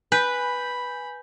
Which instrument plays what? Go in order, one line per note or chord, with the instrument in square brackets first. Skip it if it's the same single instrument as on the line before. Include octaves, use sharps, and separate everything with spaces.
[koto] B4 [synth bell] G#5 G6 [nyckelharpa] B5